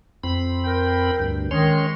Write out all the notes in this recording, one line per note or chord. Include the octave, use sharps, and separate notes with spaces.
F2 C4 B5
A#4 G5
D2 G2
D#3 G#3 C#4 C#5 C6